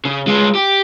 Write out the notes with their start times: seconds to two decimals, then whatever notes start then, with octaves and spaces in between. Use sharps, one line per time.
0.05 C#3
0.27 G#3 F4
0.55 G4